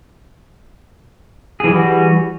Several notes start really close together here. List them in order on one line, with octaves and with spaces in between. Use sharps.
G#4 E3 G3 F#4